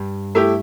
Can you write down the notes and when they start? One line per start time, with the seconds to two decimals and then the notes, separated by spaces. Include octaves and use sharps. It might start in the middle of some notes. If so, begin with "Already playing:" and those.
Already playing: G2
0.35 A3 E4 G4